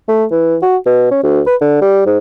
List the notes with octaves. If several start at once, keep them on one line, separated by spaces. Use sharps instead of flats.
A3
E3
F#4
B2
C#4
D2
B4
D3
G3
G#2